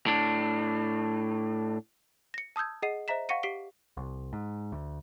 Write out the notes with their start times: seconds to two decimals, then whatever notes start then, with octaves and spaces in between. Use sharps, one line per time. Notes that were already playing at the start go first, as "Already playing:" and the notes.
0.06 A2 D4
2.34 A#6 C#7
2.56 A5 D#6 E6 G6 G#6
2.82 G#4 D#5 F#5 C7 D#7
3.08 C5 D#5 E5 A#5 B6 E7
3.29 F5 F#5 C#6 A#6 C#7 D#7
3.43 G4 B6 C7 D7 G7
3.97 C2
4.33 G#2
4.72 D2